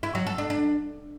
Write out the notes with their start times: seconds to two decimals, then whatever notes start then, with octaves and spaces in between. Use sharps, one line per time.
0.03 E4
0.15 F#3
0.27 A4
0.38 D4
0.50 D4